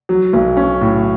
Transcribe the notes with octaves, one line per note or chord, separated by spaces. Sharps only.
F#3
B1
C#4
A2